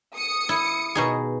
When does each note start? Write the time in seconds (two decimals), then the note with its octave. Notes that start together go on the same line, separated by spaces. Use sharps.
0.15 D#6 C#7
0.49 E4
0.95 B2 D#4 G#4